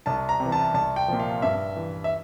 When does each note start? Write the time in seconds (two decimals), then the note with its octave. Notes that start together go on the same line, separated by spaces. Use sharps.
0.06 C2 A5
0.29 A#5
0.40 C3
0.45 E3
0.52 A5
0.74 C2 A5
0.96 G5
1.08 A#2 F3
1.20 F5
1.42 G2 E5
1.76 E3
2.04 E5